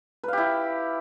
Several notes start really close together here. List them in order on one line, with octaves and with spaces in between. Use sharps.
B4 F5 G4 E4